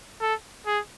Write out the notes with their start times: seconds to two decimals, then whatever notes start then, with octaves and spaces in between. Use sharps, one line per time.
0.21 A4
0.66 G#4